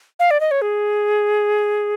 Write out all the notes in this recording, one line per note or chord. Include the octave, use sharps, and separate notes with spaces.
F5
D5
D#5
C#5
G#4